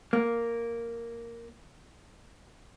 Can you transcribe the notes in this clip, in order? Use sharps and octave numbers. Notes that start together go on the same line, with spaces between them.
A#3